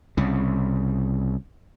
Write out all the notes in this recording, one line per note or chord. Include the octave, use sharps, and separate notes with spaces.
C2 C#3